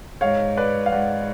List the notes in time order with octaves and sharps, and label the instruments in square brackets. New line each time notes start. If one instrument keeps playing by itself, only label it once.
[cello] G#2 [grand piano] C#5 F5
[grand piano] B4 D5
F5
[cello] G#2 [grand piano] D5 F#5